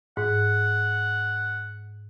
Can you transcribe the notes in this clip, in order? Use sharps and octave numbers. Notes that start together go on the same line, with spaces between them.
G#2 F#5